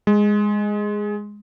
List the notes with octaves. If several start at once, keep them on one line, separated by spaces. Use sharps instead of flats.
G#3